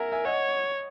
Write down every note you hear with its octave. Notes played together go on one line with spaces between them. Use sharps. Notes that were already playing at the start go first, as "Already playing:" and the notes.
Already playing: A#4 E5 F#5 G#5 A#5
E5 G#5
C#5 D#5 F#5